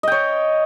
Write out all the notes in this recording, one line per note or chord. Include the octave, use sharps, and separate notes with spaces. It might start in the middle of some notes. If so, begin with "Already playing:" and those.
C#5 D#5 G5